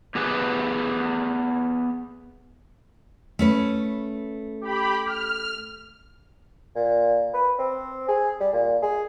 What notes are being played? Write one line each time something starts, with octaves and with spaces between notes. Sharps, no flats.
B3 G4 G#4 B4
A3 C#4 B4
G4 B5
F6
A#2
B4
C4
G#4
G3
A#2
G#4